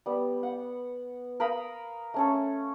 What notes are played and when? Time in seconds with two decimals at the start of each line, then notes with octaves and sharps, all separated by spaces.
0.06 G3 B3
0.43 F#5
1.40 A#4 F5 B5 D#6
2.14 A3 C#4 A4